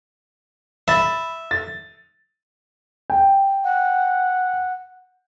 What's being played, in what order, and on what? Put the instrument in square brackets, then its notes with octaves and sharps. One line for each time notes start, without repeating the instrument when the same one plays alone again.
[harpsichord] E5 [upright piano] B5 A6
[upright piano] A6
[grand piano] G5
[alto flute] F#5